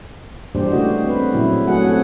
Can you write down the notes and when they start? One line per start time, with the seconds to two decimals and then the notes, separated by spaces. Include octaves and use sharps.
0.55 E3 G3 A#3 D4 G4 C5
0.71 C#3 A3 F#4 D#5
1.04 C4 B4
1.33 A#2 C#3 F#3 E4
1.67 F#3 A3 F#4 G#4 F#5
1.80 A3 C4 A4 F#5